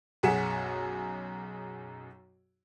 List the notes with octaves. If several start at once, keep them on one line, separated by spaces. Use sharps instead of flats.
B1 F#2 G#4 F#5 B6 E7